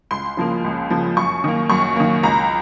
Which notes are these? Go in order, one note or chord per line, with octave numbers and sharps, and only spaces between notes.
C#2 C6
C#3 F3 A#3
C#2
C#3 F3 A#3
F#2 C#6
D#3 A#3
F#2 C#6
D#3 A#3
C#2 A#5